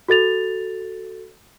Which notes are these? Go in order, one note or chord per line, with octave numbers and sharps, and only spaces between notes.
F#4 A4 A6 F7